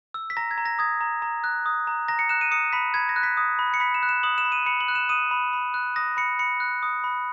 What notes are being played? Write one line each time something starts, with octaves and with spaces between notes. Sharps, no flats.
E6
B6
A#5 A#6
G#6
A#5
A#6
D#6 G#6
A#5
A#5
F#6
D#6
A#5
A#5 A#6
C#7
F#6 E7
D#7
D#6 C#7
B5 B6
B5 G#6
A#6
F#6
B6
D#6
B5
C#7
B5 B6
E7
F#6
E7
D#6 F#7
E7
B5
D#7
B5 C#7
F#7
F#6
E7
D#6 D#7
B5
B5
F#6
D#6 A#6
B5 C#7
B5 C#7
F#6
D#6
B5